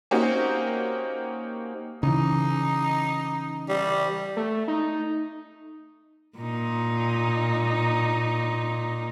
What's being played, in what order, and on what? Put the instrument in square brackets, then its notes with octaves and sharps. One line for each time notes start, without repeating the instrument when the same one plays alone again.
[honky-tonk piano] A#3 C4 C#4 D#4 F#4 G4
[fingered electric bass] C#3 E3 [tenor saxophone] D#4
[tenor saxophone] G3
[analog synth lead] A3
D#4
[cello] A#2 D#4